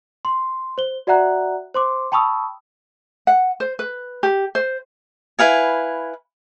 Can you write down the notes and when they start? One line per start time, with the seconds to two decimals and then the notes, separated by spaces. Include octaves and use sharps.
0.25 C6
0.78 C5 G7
1.07 F#4 D5 E5 F#5 A#5 F#6
1.74 C5 C6 D6
2.12 G5 A5 B5 C#6 D#6 E6
3.27 F#5
3.60 C5
3.79 B4
4.23 G4
4.55 C5
5.39 E4 B4 F5 G#5